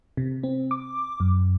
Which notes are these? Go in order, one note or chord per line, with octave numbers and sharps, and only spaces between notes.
C3
C4
D6
F#2